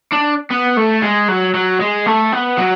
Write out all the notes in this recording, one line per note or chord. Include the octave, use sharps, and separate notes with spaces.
D4
B3
A3
G#3
F#3
F#3
G#3
A3
B3
F#3